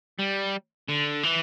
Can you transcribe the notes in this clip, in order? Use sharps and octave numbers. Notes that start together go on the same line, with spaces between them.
G3
D3
E3